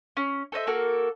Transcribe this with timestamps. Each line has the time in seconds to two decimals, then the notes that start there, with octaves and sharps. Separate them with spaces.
0.17 C#4
0.52 A4 C5 D#5 E5
0.67 A#3 F#4 A4 A#4